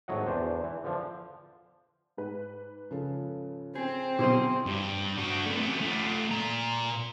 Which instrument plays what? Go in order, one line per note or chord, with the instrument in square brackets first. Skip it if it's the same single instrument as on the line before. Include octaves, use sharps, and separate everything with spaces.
[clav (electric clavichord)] G#1 A2 F#3 D#5 F#5
E2 D4 C5
E3
D3 F3 D4
[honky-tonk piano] G#2 B4
[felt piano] C#3 F3 A4
[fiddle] C4 [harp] G#4
[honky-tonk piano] B2 D3 F#3 [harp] E4 C5 D#5
[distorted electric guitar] G2
D4 F#4
C3 A3
A3 C#4
A3 F4
A#2 A#5